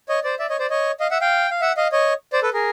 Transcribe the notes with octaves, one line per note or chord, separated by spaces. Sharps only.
C#5 D#5
C5 D5
D5 E5
C#5 D#5
C5 D5
C#5 D#5
D#5 F5
E5 F#5
F5 G5
F5
E5 F#5
D#5 F5
C#5 D#5
C5 D5
A4 B4
G#4 A#4